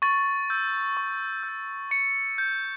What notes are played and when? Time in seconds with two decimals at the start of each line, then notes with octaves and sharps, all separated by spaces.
0.02 C#6 A6
0.50 E6 G6
0.97 C#6
1.43 E6
1.48 G6
1.91 C#6 C#7
2.38 G6